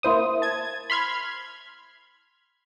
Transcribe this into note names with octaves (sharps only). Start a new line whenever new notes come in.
A#3 E4 C5 D#6
A5 G#6
B5 C6 F6 G#6